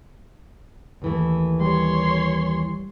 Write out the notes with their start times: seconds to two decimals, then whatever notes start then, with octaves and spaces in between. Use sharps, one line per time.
1.02 D#2 E3 A3
1.61 G3 C#5 C6